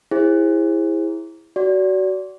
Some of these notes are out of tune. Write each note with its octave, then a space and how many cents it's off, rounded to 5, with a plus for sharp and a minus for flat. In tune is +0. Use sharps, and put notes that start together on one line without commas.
E4 +0 G#4 -30 C5 +25
F#4 +25 D5 -30